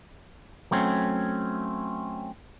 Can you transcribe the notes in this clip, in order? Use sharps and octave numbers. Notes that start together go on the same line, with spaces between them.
F#3 A3 C4 C#4